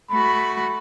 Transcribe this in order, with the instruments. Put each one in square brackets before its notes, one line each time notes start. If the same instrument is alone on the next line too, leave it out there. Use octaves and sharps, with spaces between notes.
[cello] A3 F#4 [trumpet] B5